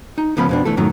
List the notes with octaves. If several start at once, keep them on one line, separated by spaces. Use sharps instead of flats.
D#4
C#2 C#3 F3 B3 C#4 B5
F2 B2 D4
E3 A3 A4
F#2 A2 D#3 F#3